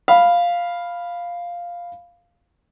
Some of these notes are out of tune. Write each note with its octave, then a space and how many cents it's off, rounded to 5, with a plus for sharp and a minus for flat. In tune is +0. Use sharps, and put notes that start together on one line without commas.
F5 +0 B5 +0